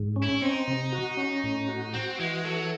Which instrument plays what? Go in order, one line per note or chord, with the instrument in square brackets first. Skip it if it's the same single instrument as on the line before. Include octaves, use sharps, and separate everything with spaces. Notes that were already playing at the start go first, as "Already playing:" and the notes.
Already playing: [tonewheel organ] G#2
C#4
[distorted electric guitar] E4
[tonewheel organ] C4 [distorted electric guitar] D#4
[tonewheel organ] C3
F#4
C#4
A2
F#4
[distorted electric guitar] C4 [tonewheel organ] F#4
[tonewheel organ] E3 [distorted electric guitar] G#3
[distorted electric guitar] F#3 [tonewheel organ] A4